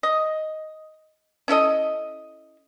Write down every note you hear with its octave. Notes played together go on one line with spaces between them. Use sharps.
D#5
C#4 E4 A4 D#5